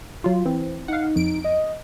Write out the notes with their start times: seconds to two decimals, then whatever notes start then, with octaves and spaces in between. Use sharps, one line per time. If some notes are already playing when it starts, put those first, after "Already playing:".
0.24 F#3 F4
0.45 E3 C4
0.88 D#4 F5 F#5
1.16 F2 D7
1.44 D#5